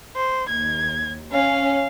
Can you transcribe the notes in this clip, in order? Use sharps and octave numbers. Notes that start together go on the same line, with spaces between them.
C5
D#2 G#6
C#4 F5